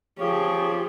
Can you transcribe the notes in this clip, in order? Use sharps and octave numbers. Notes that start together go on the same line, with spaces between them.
F3 G4 G#4 C#5